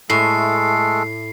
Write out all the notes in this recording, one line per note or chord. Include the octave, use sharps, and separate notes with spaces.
A2 G#3 A3 A4 C7